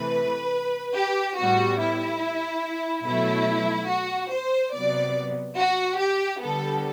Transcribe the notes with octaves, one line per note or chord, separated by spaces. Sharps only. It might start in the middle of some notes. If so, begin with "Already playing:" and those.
Already playing: C3 E3 A3 B4
G4
A2 G3 B3 F#4
E4
B2 F#3 A3 E4
F#4
C5
C3 F#3 B3 D5
F#4
G4
D3 G3 B3 A4